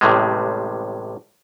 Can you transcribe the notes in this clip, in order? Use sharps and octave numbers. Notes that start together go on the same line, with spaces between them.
A1 A2 C3 G3 G#3